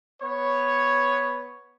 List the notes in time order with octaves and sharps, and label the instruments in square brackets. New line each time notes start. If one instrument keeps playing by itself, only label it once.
[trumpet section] B3 C#5